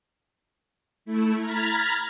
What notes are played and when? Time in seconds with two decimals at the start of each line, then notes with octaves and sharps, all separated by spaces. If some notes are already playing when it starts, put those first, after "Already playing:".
1.05 A3 E4
1.40 A#5 B5 F6 G#6 A6 B6